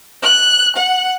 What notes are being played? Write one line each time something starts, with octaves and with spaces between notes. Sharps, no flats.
F#6
F#5